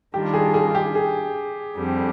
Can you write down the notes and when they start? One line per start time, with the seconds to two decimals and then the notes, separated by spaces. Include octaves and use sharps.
0.14 D#3 G3 D4 F4 G4
0.34 G#4
0.54 G#4
0.75 G4
0.95 G#4
1.76 F2 D3 G3 C4